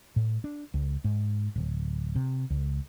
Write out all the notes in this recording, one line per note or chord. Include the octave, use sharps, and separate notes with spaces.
A2
D4
C#2
G#2
D1
C3
C#2